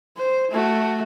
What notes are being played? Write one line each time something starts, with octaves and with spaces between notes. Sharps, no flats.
C5
A3 F#4